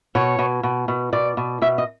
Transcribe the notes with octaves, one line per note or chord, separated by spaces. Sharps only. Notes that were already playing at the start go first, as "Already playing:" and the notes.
B2 C#5
B2
B2
B2
B2 D5
B2
B2 E5
D#5